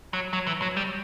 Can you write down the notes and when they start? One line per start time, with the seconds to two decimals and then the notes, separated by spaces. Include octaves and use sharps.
0.13 F#3
0.33 F#3
0.47 E3
0.62 F#3
0.77 G3